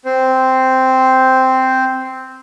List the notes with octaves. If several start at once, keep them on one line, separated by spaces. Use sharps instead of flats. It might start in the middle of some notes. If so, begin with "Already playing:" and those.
C4 C5